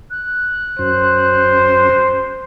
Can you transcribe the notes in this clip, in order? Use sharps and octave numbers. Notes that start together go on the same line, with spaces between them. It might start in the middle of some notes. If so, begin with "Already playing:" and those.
F#6
F#2 C5